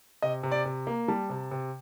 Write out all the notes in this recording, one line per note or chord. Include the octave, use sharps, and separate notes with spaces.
C3 D#5
C3
D5
C3
A#3
G3 A5
C3
C3